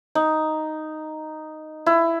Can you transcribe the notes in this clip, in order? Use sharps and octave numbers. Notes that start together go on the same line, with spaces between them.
D#4
E4